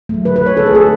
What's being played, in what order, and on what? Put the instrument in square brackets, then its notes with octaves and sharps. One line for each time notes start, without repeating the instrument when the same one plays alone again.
[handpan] F#3 A3
D3 B4
B4
A3 C#5
D3 A4
G#4
A3 A4